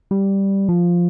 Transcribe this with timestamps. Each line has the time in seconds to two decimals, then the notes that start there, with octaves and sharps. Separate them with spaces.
0.11 G3
0.69 F3